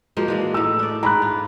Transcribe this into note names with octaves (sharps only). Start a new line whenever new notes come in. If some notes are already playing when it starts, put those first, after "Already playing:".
F3 G#3 A#3 F#4
E3 G#3 D4
A2 D#4 E6
D4 D5
G#2 A#5 B5 F#6
F4